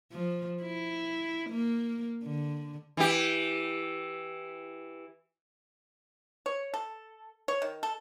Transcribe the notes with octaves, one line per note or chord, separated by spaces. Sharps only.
F3
E4
A#3
D3
E3 G4
C#5
A4
C#5
D#3
A4